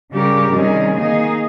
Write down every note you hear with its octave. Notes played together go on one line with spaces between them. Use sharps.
C#3 G3 C#4 G4 A#4
C3 D#3 G3 C#4 G#4
D#3 A#3 D#4 G#4